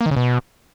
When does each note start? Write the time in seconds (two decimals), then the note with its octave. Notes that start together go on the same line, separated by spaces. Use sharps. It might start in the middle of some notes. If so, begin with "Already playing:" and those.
0.01 A#3
0.06 D#3
0.11 C#3
0.17 B2